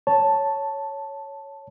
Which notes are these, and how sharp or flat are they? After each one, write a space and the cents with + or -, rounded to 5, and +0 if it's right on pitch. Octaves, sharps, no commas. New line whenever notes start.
C#5 +0 A5 +0